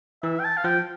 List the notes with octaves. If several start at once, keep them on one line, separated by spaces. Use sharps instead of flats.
E3 E5
G5
A5
F5
F3 G5